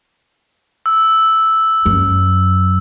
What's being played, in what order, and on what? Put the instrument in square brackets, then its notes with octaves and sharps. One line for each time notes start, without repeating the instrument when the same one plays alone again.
[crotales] E6
[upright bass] F#2